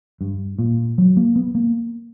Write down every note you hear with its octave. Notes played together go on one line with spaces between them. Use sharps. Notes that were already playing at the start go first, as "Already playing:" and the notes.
G2
A#2
F#3
A#3
B3
A#3